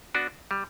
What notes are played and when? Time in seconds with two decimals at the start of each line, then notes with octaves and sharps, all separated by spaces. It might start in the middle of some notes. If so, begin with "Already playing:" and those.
0.15 B3 D4 F#4
0.51 G3